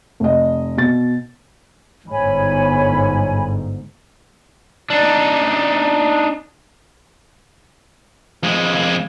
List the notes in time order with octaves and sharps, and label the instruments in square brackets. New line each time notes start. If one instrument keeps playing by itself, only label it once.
[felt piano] F1 D#5
B2 A6
[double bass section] G1 G#2 [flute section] C#5 G#5 B5
[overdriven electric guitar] D4 D#4
[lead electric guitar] F2 G#3